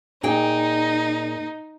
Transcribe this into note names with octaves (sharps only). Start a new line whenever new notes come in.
A#2 D#4 G#4 G5